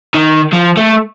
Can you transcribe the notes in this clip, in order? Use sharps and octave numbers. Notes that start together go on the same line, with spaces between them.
D#3
F3
A3